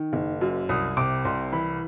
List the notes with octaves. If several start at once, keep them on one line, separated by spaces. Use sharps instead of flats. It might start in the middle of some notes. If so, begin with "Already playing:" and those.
Already playing: D#3
F#1
F#2
C2 D#6
C3 D6
C2 C6
E3 B5